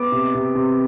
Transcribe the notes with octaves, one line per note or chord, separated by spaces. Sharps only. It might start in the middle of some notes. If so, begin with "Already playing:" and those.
Already playing: B3 D6
C3
C3
C3